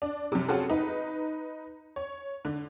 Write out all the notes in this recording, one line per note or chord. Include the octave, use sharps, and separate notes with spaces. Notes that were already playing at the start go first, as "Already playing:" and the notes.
D4
F#2 C3
C4 C#4 F4 F#4 G#4 A4
D#4 B4
C#5
D3